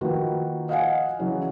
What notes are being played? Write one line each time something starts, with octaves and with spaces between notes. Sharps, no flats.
D#3 F3 A#3 F#4 B4
D#5 F5 F#5 G#5
C#3 E3 F#3